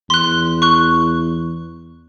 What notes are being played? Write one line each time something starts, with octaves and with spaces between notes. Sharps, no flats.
E2 C6 F#6
C#6 F#6